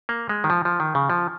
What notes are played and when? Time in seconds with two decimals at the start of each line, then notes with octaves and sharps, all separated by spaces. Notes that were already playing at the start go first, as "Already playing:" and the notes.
0.09 A#3
0.29 G#3
0.44 D#3
0.50 F3
0.65 F3
0.80 D#3
0.95 C#3
1.10 F3